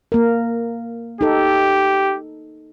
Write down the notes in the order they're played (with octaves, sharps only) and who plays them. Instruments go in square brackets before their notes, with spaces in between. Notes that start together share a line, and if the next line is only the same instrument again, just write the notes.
[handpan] A#3 A#4
[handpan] D#4 A4 [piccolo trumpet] G4